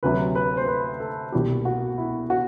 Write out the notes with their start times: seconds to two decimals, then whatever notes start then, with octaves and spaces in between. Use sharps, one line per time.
0.03 D2 C3 F#3 B4
0.35 B4
0.57 C5
0.68 B4
1.00 A4
1.32 C2 B2 G3 G4
1.65 F#4
1.98 E4
2.30 F#4